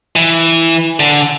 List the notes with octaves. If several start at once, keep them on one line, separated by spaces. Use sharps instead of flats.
E3
D3